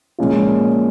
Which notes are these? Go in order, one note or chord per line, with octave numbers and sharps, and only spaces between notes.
A#2 F3 G#3 C#4 F4